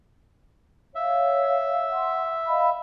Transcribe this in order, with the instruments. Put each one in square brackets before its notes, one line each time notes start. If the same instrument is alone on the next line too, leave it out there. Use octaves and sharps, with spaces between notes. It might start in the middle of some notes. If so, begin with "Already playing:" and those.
[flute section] C#5 F5 [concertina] E5
[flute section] F#5 C6
D#5 F5 B5